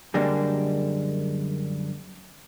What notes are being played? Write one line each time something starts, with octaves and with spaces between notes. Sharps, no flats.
F#2 D3 G3 G#3 A#3 D4